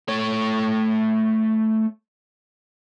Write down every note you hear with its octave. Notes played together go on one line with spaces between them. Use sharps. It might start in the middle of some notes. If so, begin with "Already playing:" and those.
A3 C#5